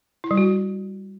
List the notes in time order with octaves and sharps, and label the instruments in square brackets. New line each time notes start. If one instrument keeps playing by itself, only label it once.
[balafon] E4
G3
F#4